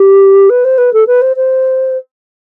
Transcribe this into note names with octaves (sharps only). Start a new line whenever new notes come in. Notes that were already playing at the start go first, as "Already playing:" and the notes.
Already playing: G4
B4
C5
B4
A4
B4
C5
C5